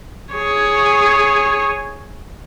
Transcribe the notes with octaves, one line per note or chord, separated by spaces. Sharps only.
G#4 C#5